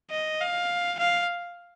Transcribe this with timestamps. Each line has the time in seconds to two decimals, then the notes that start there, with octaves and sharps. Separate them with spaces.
0.11 D#5
0.41 F5
0.99 F5